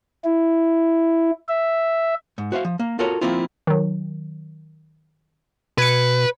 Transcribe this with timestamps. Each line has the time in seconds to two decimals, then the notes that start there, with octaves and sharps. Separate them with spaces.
0.25 E4
1.48 E5
2.38 G#2
2.52 F#4 C5 E5 F5
2.65 F3
2.79 A#3
2.99 F4 F#4 A4 A#4 C#5
3.21 F3 G#3 A#3 C4 E4 F4
3.67 D#3 F#3
5.78 B2 B4 G#6 C#7